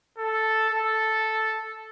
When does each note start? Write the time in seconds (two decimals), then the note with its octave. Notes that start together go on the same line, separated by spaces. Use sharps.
0.18 A4
0.69 A4